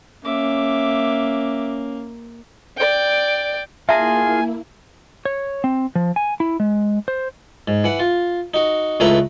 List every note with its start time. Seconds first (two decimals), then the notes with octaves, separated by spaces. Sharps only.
0.25 A#3 C#4 E5 D6
2.77 D5 G5
3.89 A#3 E4 F4 G#4 E5 G#5 A5
5.25 C#5
5.64 C4
5.95 F3
6.16 G#5
6.40 E4
6.60 G#3
7.08 C5
7.68 G#2
7.84 E3 F#5
7.99 F4
8.54 D#4 F#4
9.00 C#2 A3 E4 B4 A#5